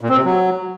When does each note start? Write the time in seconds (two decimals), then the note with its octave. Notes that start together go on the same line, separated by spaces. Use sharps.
0.01 A#2
0.09 C4
0.17 C3
0.24 F#3